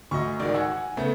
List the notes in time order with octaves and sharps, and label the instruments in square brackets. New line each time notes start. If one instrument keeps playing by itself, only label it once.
[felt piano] D2 [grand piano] D#5 C#6
[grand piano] G#2 D#3 F#4 [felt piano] D5
[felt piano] F#5 G#5 [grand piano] E6 G#6
[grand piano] C#3 A3 B3